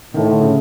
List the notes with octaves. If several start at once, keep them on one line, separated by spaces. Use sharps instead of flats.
A2 D#3
D3
C#3